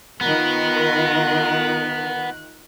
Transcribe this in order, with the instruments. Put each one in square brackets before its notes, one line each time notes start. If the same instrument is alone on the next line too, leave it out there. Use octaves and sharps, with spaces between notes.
[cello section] D#3 F4 A#4 [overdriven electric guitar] B3 [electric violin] F#6